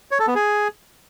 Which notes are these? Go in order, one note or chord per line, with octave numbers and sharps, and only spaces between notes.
C#5
A4
B3
G#4